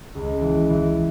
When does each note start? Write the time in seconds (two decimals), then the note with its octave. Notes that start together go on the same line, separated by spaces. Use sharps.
0.15 C#2
0.41 E3
0.70 E3